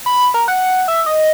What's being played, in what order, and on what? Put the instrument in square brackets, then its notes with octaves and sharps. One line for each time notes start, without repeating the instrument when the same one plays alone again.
[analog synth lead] B5
A#4
F#5
E5
D#5